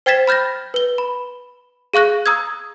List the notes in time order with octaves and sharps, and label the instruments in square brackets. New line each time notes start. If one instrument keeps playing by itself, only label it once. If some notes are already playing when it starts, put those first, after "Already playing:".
[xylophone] C5 G5 G#6 A6 B6 E7
B5 F6 G6 A6 A#6
B4 G7
B5
G#4 F5 C#6 F#6 A#6
A#5 D#6 E6 G#6